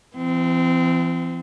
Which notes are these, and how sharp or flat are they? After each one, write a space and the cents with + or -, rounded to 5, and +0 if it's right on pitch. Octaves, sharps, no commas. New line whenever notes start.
E3 +40 C4 -25